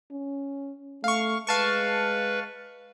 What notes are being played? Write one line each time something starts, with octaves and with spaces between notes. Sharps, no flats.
C#4
A3 F5 C#6
G#3 B4 F5 A5 C#6